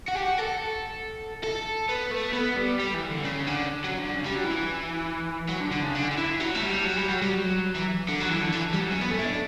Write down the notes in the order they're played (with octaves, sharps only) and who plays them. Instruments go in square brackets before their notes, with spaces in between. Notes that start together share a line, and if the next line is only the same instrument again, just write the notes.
[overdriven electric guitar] F#4
G4
F#4
A4
A4
B3
A3
B3
G3
G3
E3
D3
C#3
D3
F#3
D3
C#3
G3
F#3
E3
F#3
D3
D3
C#3
D3
D3
E3
F#3
A3
G3
F#3
G3
F#3
G3
F#3
E3
D3
F#3
E3
D3
E3
G3
F#3
C#4
B3
A3
E4
D4